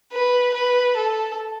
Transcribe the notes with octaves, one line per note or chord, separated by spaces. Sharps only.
B4
B4
A4